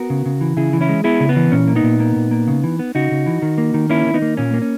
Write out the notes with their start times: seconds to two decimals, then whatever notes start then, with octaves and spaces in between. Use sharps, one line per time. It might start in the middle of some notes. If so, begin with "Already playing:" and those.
Already playing: B3 F#4 A#4
0.10 C#3
0.26 C#3
0.41 E3
0.57 C#3 E4 G#4
0.73 E3
0.81 C#4 E4
0.89 G#3
1.04 B3 E4 G#4
1.20 C#3
1.29 B3
1.36 E3
1.52 A#2 C#4
1.68 A#3
1.76 B3 D#4
1.83 A#2
2.00 A#3
2.16 A#2
2.31 A#3
2.48 C#3
2.64 E3
2.79 B3
2.95 C#3 D#4 F#4
3.11 C#3
3.26 E3
3.42 D#3
3.58 A#3
3.74 D#3
3.90 A#3 C#4 E4
4.06 D#3
4.14 B3 D#4
4.22 A#3
4.37 A#2 C#4
4.54 A#3
4.62 C#4